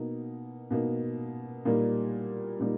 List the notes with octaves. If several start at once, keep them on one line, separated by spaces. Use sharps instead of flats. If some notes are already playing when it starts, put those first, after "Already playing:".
Already playing: B2 A#3 D#4
B2 A#3 D#4
A#2 G3 A#3 D#4
A#2 G3 A#3 D#4